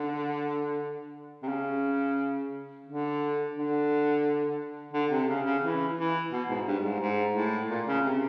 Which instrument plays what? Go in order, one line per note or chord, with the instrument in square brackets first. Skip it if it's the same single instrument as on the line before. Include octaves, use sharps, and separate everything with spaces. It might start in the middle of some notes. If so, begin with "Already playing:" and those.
Already playing: [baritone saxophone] D3
C3
C#3
D3
D3
D3
C3
C#3
C#3
E3
E3
B2
G#2
G2
G#2
G#2
A2
A#2
C#3
C3